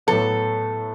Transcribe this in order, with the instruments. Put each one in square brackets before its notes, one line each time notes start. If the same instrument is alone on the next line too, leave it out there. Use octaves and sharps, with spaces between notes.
[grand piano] A2 F#3 B3 [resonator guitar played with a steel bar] A4